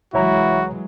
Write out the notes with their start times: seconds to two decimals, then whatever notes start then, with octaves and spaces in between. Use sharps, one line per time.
0.14 C2 E3 F#3 G#3 E4 F#4 C#5 A#5